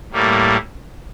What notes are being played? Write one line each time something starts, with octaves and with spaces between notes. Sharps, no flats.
A2 G3 A#3